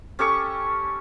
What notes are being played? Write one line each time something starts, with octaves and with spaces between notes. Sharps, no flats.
C#4 G4 A4 C#6